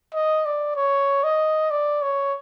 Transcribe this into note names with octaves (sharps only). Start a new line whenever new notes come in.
D#5
D5
C#5
D#5
D5
C#5